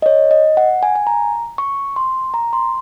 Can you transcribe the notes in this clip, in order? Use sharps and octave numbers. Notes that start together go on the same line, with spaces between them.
D#5
C#5
D#5
F#5
G#5
G#5
A#5
C#6
C6
A#5
C6